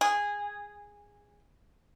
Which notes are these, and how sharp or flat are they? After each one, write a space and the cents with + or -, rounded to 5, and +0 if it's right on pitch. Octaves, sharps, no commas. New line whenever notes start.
G#4 -15